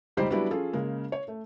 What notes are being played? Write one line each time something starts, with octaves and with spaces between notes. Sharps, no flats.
F1 C#2 G3 D#4 G4 C5
F#3 G3 B3 D4 E4 G4
F3 C#4 F4 G#4 A4
C#3 G#3 A#3
C#5
A3